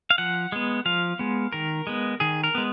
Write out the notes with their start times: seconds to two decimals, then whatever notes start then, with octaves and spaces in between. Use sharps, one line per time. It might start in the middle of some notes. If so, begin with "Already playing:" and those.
0.10 F5
0.18 F3 F#5
0.52 G#3 B3
0.86 F3 F5
1.19 G#3 B3
1.53 D#3 A#4
1.87 G#3 B3
2.20 D#3 G#4
2.44 A#4
2.55 G#3 B3